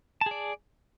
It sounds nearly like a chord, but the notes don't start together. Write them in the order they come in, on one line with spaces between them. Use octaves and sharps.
A5 G#4 D5